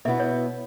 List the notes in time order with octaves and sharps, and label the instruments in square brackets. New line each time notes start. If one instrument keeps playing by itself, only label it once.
[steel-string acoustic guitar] B2 B3 E4 [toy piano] E5
[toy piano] C#5